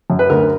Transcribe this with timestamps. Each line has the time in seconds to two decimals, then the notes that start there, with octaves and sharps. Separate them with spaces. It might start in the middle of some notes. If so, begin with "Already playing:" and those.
0.10 F#2
0.19 B4
0.30 D2 A#4